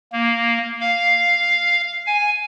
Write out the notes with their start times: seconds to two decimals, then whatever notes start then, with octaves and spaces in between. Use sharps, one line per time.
0.13 A#3
0.80 F5
2.06 G#5